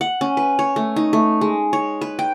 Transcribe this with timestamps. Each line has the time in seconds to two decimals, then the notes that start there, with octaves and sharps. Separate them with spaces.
0.01 F#5
0.21 C#4
0.37 B4
0.59 C#5
0.76 A3
0.96 D#4
1.13 A3
1.41 G#3
1.73 C#5
2.01 B4
2.19 G5